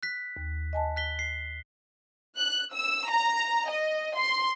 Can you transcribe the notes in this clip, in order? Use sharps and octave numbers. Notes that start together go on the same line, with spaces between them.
F#6 B6
D#2
D#5 G#5 A5
F#6 B6 G7
C7
F#6
E6
A#5
D#5
C6